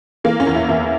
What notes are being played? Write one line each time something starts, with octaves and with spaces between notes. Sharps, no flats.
E3 A#3
C#4
E2
E4
E2 E4